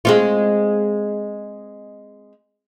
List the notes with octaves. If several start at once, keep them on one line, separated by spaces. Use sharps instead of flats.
G#3 C4 F4